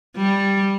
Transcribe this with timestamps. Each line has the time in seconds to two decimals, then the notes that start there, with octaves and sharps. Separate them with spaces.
0.16 G3